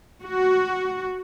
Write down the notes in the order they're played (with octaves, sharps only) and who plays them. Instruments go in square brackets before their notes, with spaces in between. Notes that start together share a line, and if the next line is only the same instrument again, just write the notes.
[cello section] F#4